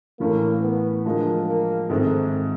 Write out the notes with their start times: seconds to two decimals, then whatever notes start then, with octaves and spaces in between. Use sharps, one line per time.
0.19 A2 E3 A3 A#3 C#4
0.62 B3
1.05 D3 F3 G#3 A#3
1.47 A#3
1.89 G#2 D#3 G#3 A3 C4